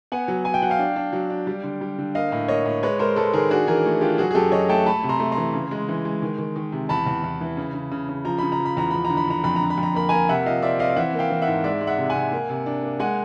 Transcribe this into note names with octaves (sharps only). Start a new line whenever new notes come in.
B3 F#5 G#5
F#3
F#3 G#5
G5
F#3 F#5
F5 G5
D4
D4
F#3
D4
G3
D3
G3
D3
A#3 D#5 F5
A2
A#3 C#5 D#5
A2
G#3 B4 C#5
G#3 A#4 C5
G#3 A4 B4
D#3 G#4 A#4
D4 F#4 G#4
E3 G#4 A#4
A3
D4 F4 G4
F#3 F#4 G#4
G#4
F#2 G4 A4
F#3 C#5 D#5
A3 G5 A5
A3 A5 B5
C3
A#5 C6
A3
A#5 C6
E3
C#3
G#3
E3
G#3
D#3
D#3
D#3
C3
E2 A5 B5
E2
E2
E3
C#3
C#3
C#3
C#3
F3 A#5
C#3 B5
A#5
F3
B5
E2 A#5
F3 B5
A#5
D3
B5
D3 A#5
F2 B5
A#5
D3
B5
F2 A#5
A#3 B5
A#3 G#5 A#5
C3 E5 F#5
F3 D#5 F5
C4 D5 E5
C4 D#5 F5
F5
E3 E5 F#5
A#3
F5 G5
E3
E5 F#5
G#2
G#3 D5 E5
G#3
E5 F#5
C3
F#5 G#5
C3
A#3
C3
D4
A#3
G#3 F#5 G#5